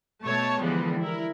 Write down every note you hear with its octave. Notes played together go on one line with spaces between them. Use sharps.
B2 A3 C#5 A5
D3 E3 F3 G3 G#3 B3
E4 A#4